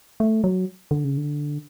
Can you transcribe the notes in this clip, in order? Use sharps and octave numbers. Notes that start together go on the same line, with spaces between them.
A3
F#3
D3
C#3
D3